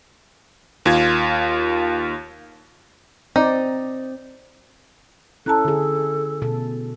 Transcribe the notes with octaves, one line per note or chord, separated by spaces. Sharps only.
D#2 F4 G#6
C4 D#4 D5
C#4 E4 A4 A5 A#5 F#6
D3 G#4
B2 A4